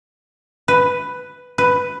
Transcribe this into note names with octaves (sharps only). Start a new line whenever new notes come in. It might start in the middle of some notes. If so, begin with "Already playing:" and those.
B4
B4